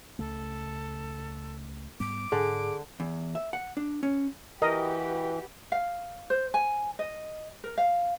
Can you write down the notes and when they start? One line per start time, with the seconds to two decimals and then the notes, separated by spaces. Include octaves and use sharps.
0.19 C#2 C#3 A3 A4
2.00 G#2 G3 B3 D6
2.32 G#2 D3 G#4
3.00 E2
3.35 E5
3.53 F#5
3.77 D4
4.03 C#4
4.62 E3 F#4 G4 A#4 B4 D#5
5.72 F5
6.30 C5
6.54 G#5
6.99 D#5
7.64 A#4
7.78 F5